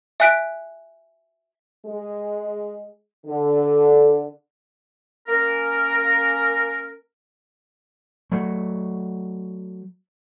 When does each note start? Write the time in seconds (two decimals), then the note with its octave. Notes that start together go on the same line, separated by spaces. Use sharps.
0.20 E5 G#5 F#6 B6 D7
1.86 G#3
3.27 D3
5.28 A#3 C#4 A#4
8.32 F#3 A3